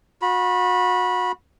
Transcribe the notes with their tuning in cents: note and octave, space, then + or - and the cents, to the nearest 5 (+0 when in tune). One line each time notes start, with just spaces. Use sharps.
F#4 -35 B5 -20